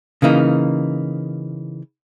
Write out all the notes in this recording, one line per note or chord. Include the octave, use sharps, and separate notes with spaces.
C#3 E3 A#3 D#4